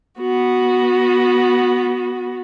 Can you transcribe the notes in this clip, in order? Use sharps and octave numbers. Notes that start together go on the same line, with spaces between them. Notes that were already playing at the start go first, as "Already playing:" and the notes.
B3 F#4